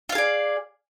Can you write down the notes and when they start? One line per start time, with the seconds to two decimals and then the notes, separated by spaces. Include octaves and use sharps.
0.09 F4
0.12 F5
0.15 G#4
0.18 D5